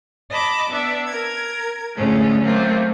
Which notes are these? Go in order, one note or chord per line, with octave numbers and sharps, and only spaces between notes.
D#5 A5 B5 D6
B3 D4 E5
A#4 G#6
D2 A2 G#3 A3 C#4
F#3 A3 A#3 C4 F4